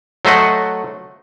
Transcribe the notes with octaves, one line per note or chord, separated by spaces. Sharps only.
F#3 A3 C5 D#5 F#5